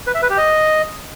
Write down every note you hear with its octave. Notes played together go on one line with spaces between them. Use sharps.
B4
E5
B4
G4
D#5